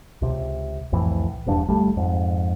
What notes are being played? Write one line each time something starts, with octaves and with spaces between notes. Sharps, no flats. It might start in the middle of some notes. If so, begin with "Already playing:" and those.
C#2 C3
C2 F2 A2 E3
D#1 E2 G2 D4
G1 G3 A3
F2 G#2